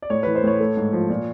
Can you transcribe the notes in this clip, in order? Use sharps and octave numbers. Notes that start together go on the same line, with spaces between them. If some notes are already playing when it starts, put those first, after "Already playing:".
D5
A2 C#5
B4
E3
C5
A2 C#5
A3
G#2
F3
A#2